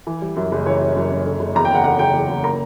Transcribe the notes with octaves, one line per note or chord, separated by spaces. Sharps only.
E3
G3
F#2
F#1
E3 C#5
G3
F#2
F#1
D3
F#1
E2 A#5
G5
F#1 F#5
D3 F#5
F#1 G5
E2
F#1
A#3 A#5